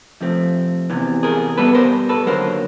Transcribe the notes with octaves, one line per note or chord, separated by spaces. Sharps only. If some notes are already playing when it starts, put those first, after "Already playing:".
F2 C3 F3 A3 C4
E2 C3 E3
G#4 A#4
B2 G3 B3 A4 B4
A#4 C5
A4 B4
D#2 D3 F#3 A#4 C5